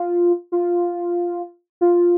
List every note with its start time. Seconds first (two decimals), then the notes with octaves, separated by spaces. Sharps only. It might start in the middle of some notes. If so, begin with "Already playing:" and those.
Already playing: F4
0.52 F4
1.81 F4